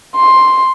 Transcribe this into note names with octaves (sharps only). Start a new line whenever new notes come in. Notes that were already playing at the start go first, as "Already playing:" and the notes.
C6